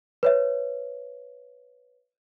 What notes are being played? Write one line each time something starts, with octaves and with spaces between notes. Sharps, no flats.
B4 C#5 E5